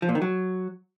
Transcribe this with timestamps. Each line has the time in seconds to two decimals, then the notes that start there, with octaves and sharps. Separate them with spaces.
0.02 F3
0.09 A#2
0.15 D#3
0.22 F#3